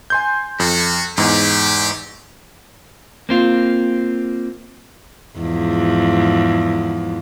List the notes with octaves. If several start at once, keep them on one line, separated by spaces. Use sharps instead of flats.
G#5 C6 G6
F2 F#4
E2 G#2 G4
A#3 C4 F4
E2 G#2 F3